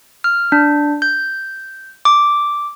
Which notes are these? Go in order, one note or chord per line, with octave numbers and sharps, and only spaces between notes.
F6
D4
G6
D6